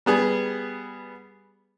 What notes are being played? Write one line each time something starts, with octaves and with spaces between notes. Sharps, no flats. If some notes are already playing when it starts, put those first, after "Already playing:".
G3 B3 G#4